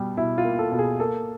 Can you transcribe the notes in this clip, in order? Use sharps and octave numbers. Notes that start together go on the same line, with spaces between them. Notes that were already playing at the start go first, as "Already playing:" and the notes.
Already playing: B2 G3
B2 E4
F4
A#3
A4
B2
G#4
A#3 A4